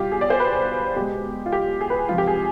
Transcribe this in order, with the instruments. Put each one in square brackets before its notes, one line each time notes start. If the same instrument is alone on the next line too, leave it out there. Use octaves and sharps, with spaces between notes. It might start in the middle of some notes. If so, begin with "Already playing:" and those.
Already playing: [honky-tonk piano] B2 G3 F4 G4
G#4
D5
C5
B4
B2 G#3 G4
F4
G4
G#4
B4
C3 F3 G#3 F4
G4
G#4